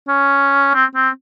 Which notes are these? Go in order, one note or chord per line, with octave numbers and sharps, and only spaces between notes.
C#4
C4
C4